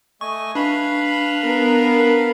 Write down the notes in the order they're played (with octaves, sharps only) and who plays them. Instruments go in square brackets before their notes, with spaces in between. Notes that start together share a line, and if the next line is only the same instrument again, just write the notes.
[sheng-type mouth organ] A3 D#5 G#5 [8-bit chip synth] C#6
[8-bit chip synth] D4 [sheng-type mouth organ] B4 F5 B5
[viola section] B3 A#4